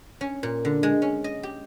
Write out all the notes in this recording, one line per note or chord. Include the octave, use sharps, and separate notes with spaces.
C#4
A#2
D3
G#3
C#4
D#5
G4